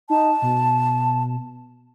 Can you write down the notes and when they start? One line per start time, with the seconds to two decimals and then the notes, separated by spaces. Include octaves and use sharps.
0.10 D#4 A5
0.42 B2